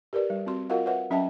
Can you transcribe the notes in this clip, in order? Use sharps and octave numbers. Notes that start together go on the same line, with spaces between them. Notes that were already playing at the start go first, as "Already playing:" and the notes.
G4 A#4 B4 D5
G3
C4 F#4 C6
F4 F#4 A#4 D#5 F5 F#5
B4 C#5 E5 F#5
F#3 C#4 D#5 E5 G5 A5